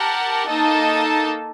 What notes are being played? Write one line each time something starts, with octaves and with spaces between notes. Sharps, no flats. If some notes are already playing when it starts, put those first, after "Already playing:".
Already playing: G4 A#4 F#5 A5
A#3 D#4 A4 D#5 A5